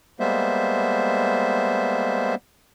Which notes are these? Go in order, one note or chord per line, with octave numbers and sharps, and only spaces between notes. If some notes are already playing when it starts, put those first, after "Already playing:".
G3 G#3 A#3 B3 C5 E5